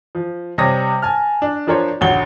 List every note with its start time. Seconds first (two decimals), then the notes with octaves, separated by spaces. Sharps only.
0.15 F3
0.58 C3 G3 C#5 D#6 A#6
1.02 G#5 A5 F6
1.42 D4
1.67 F3 D4 A#4 C5 C#5
2.01 A#1 D#2 D3 F#4 C#5 G7